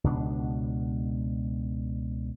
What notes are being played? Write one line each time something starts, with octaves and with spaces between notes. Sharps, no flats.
C#2 B2 D4